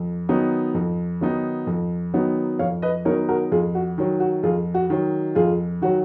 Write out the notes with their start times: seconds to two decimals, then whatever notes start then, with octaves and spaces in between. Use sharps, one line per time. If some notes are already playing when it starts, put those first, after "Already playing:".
Already playing: F2
0.29 D#3 F#3 B3 D#4
0.74 F2
1.21 D#3 F#3 B3 D#4
1.67 F2
2.14 D#3 F#3 B3 D#4
2.59 F2 C#5 F5
2.82 B4 D#5
3.05 D#3 F#3 B3 D#4 A#4 C#5
3.29 F#4 A#4
3.52 F2 F4 G#4
3.75 F#4
3.98 D#3 F#3
4.20 F#4
4.43 F2 F4 G#4
4.74 F#4
4.90 D#3 F#3
5.35 F2 F4 G#4
5.82 D#3 F#3 F#4